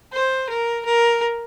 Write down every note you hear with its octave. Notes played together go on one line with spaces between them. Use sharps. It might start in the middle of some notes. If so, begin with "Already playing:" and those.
C5
A#4
A#4